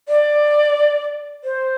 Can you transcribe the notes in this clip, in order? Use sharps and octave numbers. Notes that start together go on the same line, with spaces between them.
D5
C5